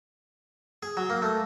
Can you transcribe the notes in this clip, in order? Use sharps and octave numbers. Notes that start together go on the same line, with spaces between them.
G#4
F#3
A#3
A3